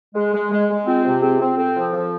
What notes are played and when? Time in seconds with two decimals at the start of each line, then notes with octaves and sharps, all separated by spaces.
0.15 G#3 G#4
0.33 G#3
0.51 G#3
0.69 G#3
0.86 C4 F4
1.04 C3
1.22 C4 G#4
1.40 C4
1.57 C4 A4
1.76 F3
1.93 F3